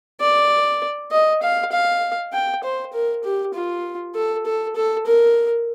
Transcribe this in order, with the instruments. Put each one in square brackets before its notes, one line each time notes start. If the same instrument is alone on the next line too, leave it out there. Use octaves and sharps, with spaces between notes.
[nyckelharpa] D5
D#5
F5
F5
G5
C5
A#4
G4
F4
A4
A4
A4
A#4